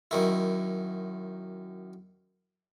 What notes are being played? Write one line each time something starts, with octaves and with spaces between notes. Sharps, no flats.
F#2 D#3 E4